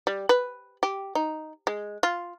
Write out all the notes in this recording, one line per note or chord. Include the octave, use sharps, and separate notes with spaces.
G3
B4
G4
D#4
G#3
F4